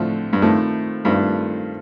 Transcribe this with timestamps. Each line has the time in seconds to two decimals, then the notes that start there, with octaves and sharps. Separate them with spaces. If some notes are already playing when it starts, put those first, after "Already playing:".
Already playing: A2 D3 F3 A3 C4
0.33 G2
0.42 A2 D#3 A3 C4 F4 A4
1.05 G2 D#3 A3 C4 F4 A4